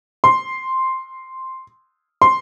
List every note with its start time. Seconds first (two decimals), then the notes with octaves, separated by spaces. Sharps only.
0.24 C6
2.22 C6